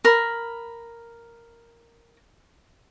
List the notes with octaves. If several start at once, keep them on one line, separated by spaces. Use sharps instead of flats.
A#4 B5